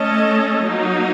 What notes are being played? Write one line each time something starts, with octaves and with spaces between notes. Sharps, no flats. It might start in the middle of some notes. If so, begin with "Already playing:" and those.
Already playing: A3 C#4 A4 D#5
F#3 A#3 D#4